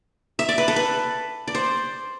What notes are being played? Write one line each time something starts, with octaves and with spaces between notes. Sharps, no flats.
E5
D5
B4
A4
B4
D5
C5